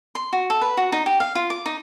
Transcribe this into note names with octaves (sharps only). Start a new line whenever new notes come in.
C6
F#4
A4
B4
F#4
D#4
G4
F5
F4
D6
D#4